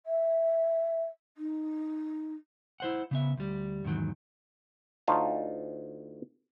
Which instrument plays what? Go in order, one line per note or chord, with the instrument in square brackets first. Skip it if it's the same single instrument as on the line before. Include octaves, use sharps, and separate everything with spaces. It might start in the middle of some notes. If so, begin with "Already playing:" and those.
[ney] E5
D#4
[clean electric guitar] E4 C5 F#5
C#3 B3 E5
D2 G3
E2 G#2 D#3 F#3
[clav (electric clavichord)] D2 D#4 F4 C#5 A5